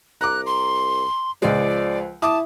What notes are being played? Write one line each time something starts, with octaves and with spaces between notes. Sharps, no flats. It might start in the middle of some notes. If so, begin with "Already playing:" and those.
C2 A#5 D6 F#6
C6
C#2 F3 G#3 D5
E4 A5 D6 D#6